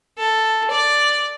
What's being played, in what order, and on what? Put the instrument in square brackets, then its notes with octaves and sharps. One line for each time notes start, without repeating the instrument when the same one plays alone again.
[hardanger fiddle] A4
D5